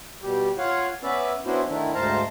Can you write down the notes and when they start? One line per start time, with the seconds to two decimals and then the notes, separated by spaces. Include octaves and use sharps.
0.23 B2 G3 G4
0.58 F4 C#5 F5 F#5
1.03 B3 C#4 B4 D5 E5
1.46 B3 C#4 D4 E4 F#4 C5
1.67 D3 D#3 A3 E4
1.95 D2 G#2 C5 F5 A5 A#5